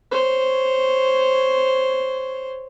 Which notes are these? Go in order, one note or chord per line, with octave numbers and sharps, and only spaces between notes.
C5 C#5